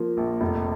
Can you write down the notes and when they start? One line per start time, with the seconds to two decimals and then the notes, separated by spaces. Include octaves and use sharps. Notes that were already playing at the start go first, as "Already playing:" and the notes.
Already playing: F3 A#3
0.17 A#1
0.41 F1